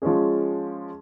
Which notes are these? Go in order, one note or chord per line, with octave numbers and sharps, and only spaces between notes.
F3 G#3 C#4 G#4